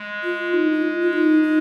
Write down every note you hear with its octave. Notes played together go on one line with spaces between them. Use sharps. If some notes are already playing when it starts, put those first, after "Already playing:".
Already playing: G#3
F4
D#4
D#4
F4
F4
D#4
D#4